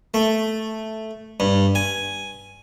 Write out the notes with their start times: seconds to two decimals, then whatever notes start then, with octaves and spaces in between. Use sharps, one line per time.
0.14 A3
1.40 G2
1.75 G#5